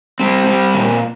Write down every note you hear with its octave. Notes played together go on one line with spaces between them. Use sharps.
G3 C4
G3
A#2